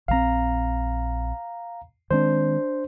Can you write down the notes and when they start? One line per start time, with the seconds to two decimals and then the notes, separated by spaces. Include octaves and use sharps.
0.08 A#1 E3 C4 F5 A#5
2.11 D#3 G#3 C4 D4 C5